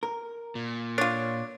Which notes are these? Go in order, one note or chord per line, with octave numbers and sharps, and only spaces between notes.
A#4
A#2
D4 F4 C#5